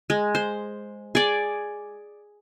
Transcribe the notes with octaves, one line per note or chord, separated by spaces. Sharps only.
G#3
C5
G#4 D5